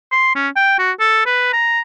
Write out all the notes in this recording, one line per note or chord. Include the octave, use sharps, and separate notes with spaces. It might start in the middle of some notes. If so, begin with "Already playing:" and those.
C6
C#4
G5
F#4
A4
B4
A#5